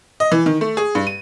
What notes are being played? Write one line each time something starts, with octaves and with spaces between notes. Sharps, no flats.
D#5
E3
D#3
A3
G#4
G2
D#7